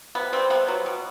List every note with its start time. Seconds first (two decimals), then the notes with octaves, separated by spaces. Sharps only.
0.15 C3 B3
0.33 G3 C4
0.50 C3 B3
0.68 F#3
0.86 B2